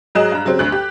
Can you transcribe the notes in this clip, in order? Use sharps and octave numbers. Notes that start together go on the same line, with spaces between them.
G#2 F#3 G#4 D#5 F#6 E7
G2 A#5
C#3 F#3 G3 C4
D2 F#6
G4